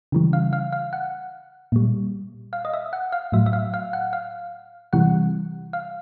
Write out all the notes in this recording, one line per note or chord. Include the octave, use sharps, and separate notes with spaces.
C#3 E3 G3
F5
F5
F5
F#5
A#2 G3
F5
D#5
E5
F#5
F5
A2 F#3 E5
E5
F5
F5
F#5
F5
C3 E3 G3 F#5
F5